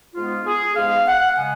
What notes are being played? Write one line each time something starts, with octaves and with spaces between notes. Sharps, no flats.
G#2 G#3 B3 F4
G#4
G#2 G#3 B3 F5
F#5
C#3 G#3 B3 G#5